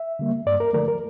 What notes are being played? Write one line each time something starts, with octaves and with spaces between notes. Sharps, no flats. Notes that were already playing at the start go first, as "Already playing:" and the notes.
Already playing: E5
D3 G3 A#3
G2 D5
A#4
D3 F3 A3 A#4
A#4